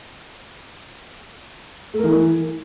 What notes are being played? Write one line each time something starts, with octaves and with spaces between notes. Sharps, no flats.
A3
A#4
E3